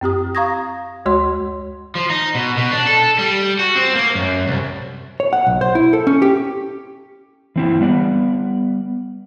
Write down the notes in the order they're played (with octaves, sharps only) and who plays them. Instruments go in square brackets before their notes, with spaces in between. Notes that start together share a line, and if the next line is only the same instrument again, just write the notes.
[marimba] F#2 C4 G4 D#6
F5 A#5 C#6 D#6 G#6 A#6
D2 G#3 F#4 C#5 C6
[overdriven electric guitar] F3
D#4
B2
B2
D4
A4
G3
F#4
C4
A#3
F#2
C2
[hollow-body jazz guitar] C#5
F#5
B1
C5
E4
A4
C#4
G4
[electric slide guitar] E3 C4 E4
G3 B3 D5